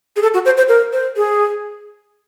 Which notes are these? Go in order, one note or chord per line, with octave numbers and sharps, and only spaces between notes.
G#4
A4
F#4
C5
C5
A#4
C5
G#4